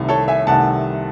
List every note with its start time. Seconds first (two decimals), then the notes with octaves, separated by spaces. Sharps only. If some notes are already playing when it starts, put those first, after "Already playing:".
Already playing: C2 C3 D#3 A3
0.09 A4 C#5
0.28 E5 G#5
0.47 C2 C3 D#3 A3 F#5 A5